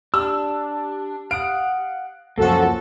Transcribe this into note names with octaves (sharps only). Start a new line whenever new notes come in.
D4 G4 E6
F5 F#5 D#6 D7
C#2 F#2 F3 A#3 C#4 F#4 A4 F5